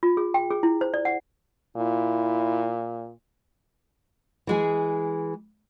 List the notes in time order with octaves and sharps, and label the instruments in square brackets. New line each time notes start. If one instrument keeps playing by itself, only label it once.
[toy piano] F4
G#4
G5
G#4
E4
C5
D5
F#5
[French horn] A#2 [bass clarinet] E4
[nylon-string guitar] E3 G#3 G#4